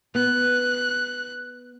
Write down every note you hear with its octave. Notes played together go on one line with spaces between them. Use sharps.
B3 F#6